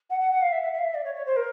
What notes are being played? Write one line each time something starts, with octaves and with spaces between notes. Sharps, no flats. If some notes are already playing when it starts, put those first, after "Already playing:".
F#5
F#5
F#5
F5
E5
E5
E5
F5
E5
D5
C#5
C#5
C5
A#4